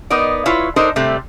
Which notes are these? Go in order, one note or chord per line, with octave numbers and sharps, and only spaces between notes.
B3 D#4 A#4 D5
E4 F4 B4 C#5
D4 D#4 A4 A#4 C5
C3 G3 A3